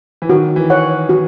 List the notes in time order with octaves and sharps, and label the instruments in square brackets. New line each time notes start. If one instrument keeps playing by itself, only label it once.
[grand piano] E3
[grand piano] D#3 [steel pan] F#4
[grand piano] E3
[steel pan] C#5 F#5
F#4